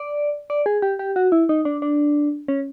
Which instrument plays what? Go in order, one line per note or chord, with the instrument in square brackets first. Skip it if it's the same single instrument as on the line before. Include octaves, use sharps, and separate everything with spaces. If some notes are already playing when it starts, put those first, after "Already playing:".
Already playing: [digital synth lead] D5
D5
G#4
G4
G4
F#4
E4
D#4
D4
D4
C#4